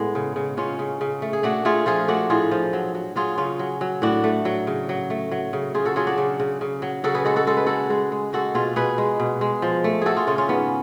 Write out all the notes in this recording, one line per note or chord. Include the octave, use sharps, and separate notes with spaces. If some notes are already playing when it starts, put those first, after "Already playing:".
Already playing: A2 G#3 B3
C#3
C#3
C#3 C#4 F4
C#3
C#3
A3
G#4
A3 D4 F#4
A3 F4 G#4
F3 F4 G#4
A3 D4 F#4
A2 F4 G#4
F3
F#3
F#3
F#3 F4 G#4
C#3 C#4 F4
F#3
F#3
A2 D4 F#4
A3
F#3
C#3
F#3
A3
F#3
C#3
C#3 F4 G#4
F#4 A4
F#3 F4 G#4
D4 F#4
C#3
C#3
C#3
F#3
C#3 F#4 A4
G#4 B4
G#3 F#4 A4
F#4 A4
G#3 A4
B4
G#3 F#4 A4
G#3
G#3
G#3 F#4 A4
B2 F4 G#4
B2 G#4 B4
G#3
B2
G#3
F3
A3
A3 F#4 G#4 A4
F4 G#4
C#3 C#4 F4
C#4 F4
G#2 B3